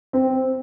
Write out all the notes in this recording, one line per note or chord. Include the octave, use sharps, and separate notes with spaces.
C4